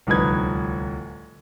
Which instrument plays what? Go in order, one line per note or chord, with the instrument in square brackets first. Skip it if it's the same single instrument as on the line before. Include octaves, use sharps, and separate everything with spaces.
[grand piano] D1 C2 F3 D#4 B4 G#6